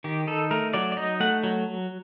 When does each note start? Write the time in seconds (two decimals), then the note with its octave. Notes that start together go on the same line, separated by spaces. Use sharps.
0.04 D#3 G4
0.27 D#4 A4
0.51 A3 A#4
0.74 F#3 D5
0.92 D5
0.97 D#4 D#5
1.20 A3 F#5
1.43 F#3